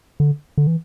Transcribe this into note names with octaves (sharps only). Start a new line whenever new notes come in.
D3
D3
E3